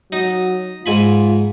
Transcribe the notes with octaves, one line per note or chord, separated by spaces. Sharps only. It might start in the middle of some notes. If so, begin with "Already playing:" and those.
F#3 D#4
G#2 F4 G#5 B5